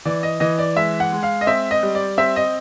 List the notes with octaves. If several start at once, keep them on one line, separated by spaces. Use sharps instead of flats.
E3 D5
D#5
E3 D#5
D5
G#3 E5
F#5
G#3
F5
D#5
C4 E5
D#5
G3
D5
C4 E5
D#5